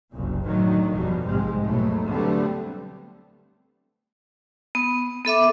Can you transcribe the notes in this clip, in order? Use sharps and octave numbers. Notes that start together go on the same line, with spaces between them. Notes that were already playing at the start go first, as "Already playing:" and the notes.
F#1 C2 A#2
A2 D3 D#3 F#3
G1 F2 B2 F#3 G3
A#1 G#2 C3 G#3 C4
D#2 B2 F#3 A3
D3 F#3 G3 A3 B3 C4
B3
B3 A4 E5 D6